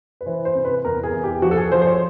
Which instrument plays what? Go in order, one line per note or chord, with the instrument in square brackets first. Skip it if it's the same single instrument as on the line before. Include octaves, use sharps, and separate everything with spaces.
[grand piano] B4
E3 C5
C5
C3
B4
E2 A#4
G#4
E2
G4
F3 F#4
A4
G#4
F3 C5
C5
C#5